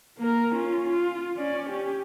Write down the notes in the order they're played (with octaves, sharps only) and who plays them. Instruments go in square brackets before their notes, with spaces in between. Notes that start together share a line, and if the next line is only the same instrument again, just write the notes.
[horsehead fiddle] A#3 A#4
C#4 F4
F4
C#4 D5
C#4 G4